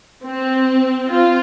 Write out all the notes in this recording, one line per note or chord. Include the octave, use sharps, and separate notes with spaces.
C4
F4